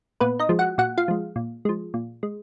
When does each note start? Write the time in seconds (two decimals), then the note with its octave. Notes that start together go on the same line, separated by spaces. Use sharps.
0.20 A#2 B3 B4
0.39 D#4 D#5
0.49 F3 G#3
0.59 F#4 F#5
0.78 A#2 F#4 F#5
0.98 F4 F5
1.08 F3 G#3
1.36 A#2
1.65 F3 G#3
1.94 A#2
2.23 G#3